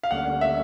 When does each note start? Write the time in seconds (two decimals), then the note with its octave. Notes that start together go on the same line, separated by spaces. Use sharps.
0.03 F5
0.11 D2 D3 G3 A#3 C#4 F#5
0.41 E5